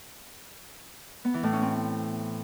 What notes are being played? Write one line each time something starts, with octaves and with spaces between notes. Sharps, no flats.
B3
E3
A2
C#4
C4